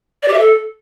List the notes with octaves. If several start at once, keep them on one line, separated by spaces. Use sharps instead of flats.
D5
G4
E5
A4